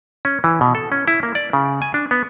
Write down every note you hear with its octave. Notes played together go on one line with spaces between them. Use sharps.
C#4
E3
B2
A4
C#4
E4
A#3
D5
C#3
G#5
D4
B3